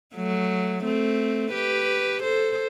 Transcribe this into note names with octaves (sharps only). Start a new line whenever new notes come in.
F#3 A3
A3 C4
G4 B4
A4 C5